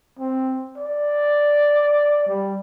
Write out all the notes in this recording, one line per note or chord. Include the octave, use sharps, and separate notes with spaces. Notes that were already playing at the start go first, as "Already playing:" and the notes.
C4
D5
G3